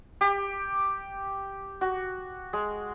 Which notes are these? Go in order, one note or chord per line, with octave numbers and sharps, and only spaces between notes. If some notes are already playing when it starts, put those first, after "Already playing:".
G4
F#4
G#3